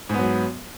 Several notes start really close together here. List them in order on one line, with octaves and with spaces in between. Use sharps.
G#2 B3 F#3